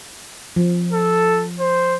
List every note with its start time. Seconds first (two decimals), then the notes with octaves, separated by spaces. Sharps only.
0.56 F3
0.92 A4
1.60 C5